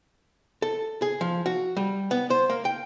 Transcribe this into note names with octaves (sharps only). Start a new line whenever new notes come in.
A4
G#4
F3
F#4
G3
B3
C5
A#3
G5